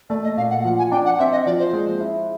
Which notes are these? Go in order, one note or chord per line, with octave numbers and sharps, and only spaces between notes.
A3 D5
D#5
A#2 F5
F#5
F3 F#5
G#5
D4 G5
F#5
C4 E5
D#5
F3 D5
C5
G#3
E4